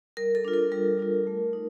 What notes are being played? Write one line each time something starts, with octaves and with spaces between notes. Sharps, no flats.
G3 A#4
A4
D4 F4
A#4
G3 A#4
D4 F4
A3
D#4